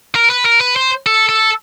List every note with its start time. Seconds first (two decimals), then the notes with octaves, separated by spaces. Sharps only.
0.15 A#4
0.30 B4
0.45 A#4
0.61 B4
0.76 C5
1.06 A4
1.29 A4